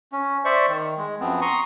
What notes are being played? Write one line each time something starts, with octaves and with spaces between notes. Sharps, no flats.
C#4
C5 D5 E5 C#6
D#3
G#3
F#2 F3 B3 C4
A#5 C6 C#6 D#6